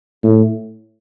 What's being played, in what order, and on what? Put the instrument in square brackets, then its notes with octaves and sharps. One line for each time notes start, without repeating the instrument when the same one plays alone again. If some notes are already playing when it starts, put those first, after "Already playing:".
[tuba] A2